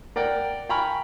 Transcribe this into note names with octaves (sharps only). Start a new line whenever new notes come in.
A#4 D5 F#5 G5
G5 G#5 A#5 B5 C#6 F6